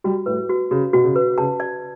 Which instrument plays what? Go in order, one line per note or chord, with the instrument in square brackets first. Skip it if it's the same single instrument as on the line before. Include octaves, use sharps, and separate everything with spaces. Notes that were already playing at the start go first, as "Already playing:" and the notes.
[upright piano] G3 [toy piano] F#4
[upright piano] A2 [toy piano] B4
[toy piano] F#4
[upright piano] C#3 [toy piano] F#4
[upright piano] B2 [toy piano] F#4
[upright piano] C#3
[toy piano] B4
[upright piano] C#3 [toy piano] A5
[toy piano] D5